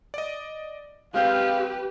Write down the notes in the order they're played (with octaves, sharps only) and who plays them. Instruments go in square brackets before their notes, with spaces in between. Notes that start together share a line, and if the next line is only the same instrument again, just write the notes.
[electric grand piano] D5 D#5
[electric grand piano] G#3 C4 G6 [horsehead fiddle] G4 B4 [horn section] F5